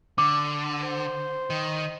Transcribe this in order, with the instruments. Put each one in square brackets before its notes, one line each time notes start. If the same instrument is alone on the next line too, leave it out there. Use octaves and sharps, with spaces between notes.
[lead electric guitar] D3 [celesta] D6
[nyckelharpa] C5
[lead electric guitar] D#3